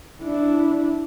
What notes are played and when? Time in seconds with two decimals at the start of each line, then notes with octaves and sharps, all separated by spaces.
0.22 D4 E4